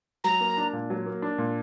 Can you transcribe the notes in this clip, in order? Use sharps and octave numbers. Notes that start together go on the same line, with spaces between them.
F#3 A#5
A#3
D4
A#2
F#3
A#3
D4
A#2